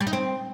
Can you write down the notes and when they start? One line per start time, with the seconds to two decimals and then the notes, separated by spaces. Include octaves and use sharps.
0.01 G3
0.07 D#4
0.13 C4